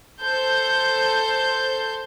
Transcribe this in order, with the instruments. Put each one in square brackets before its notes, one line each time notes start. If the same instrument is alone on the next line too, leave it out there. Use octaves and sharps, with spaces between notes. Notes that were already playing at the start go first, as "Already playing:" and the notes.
[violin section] A4 C5 G6